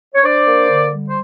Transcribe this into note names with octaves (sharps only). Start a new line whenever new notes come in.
C#5
D4 C5 D5
A#3
D3
G3
C5